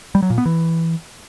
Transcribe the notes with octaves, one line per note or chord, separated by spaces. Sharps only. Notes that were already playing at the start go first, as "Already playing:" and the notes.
G3
F#3
A#2
B3
E3